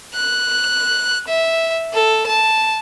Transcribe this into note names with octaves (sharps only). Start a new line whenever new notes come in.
F#6
E5
A4
A5